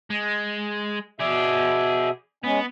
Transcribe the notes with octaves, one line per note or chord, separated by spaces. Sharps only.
G#3
B2 G#4 D5 E5
G#3 B3 C#4